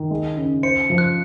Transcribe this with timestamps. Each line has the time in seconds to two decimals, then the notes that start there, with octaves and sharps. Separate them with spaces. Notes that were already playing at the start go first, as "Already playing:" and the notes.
Already playing: D#3
0.11 G#3
0.37 C#3
0.63 C5 C#7
0.90 F3
0.98 F#6